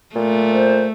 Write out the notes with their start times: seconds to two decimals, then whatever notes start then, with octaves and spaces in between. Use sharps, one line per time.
0.16 A#2 A3
0.53 C5